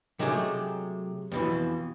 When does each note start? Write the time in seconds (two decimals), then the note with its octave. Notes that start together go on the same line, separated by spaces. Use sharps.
0.19 C3 F#3 G#3 A3 G4 G#4
1.32 F2 B2 E3